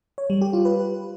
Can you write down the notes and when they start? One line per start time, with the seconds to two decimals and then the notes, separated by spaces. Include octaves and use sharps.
0.18 C#5
0.30 G3
0.41 G4
0.53 F4
0.65 B4